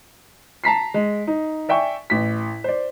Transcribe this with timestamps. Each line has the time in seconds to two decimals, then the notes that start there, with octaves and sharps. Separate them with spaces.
0.64 A5 A#5 B6 C7
0.94 G#3
1.27 D#4
1.69 D5 E5 G5 G#5 C#6
2.10 A1 B6
2.64 C5 D5